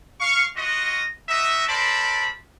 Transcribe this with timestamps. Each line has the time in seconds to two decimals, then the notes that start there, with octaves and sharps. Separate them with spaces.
0.20 F5 C#6
0.56 F4 F#4 D#5
1.28 D#4 F#4 D#5 E5
1.68 A4 A#4 C5 D5 A5 B5